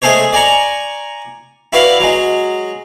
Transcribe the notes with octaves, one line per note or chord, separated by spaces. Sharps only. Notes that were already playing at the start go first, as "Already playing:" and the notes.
G#3 A3 G#4 A4 C5 C#5
D5 G#5 A#5 C#6
E4 F#4 B4 D5 F5
F#3 G#3